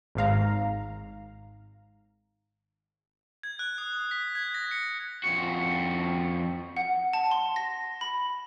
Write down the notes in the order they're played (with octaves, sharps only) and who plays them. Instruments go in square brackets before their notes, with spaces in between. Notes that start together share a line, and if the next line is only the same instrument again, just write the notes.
[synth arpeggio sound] G#1 G#2 F5 A#5
[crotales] G#6
F#6
D#6
D#6
B6
G#6
A#6
C#7
[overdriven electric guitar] F2 F#4
[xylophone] F#5
A5
C6
A#6
B5